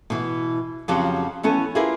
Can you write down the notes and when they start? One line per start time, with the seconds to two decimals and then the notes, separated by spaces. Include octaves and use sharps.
0.10 B2 E3
0.88 F2 C#3 F3 F#3 F#4 G4
1.43 E3 B3 C#4 A4
1.75 E4 F4 G4 G#4 A#4 B4